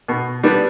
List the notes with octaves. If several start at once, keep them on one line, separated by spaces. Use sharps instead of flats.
B2
G3 B3 D4